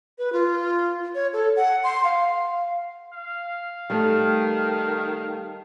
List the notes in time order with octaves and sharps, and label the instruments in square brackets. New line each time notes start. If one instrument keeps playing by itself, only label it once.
[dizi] B4
F4
C#5
A4
F#5
C6
F5
[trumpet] F5
[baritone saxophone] D#3 [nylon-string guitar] G3 A3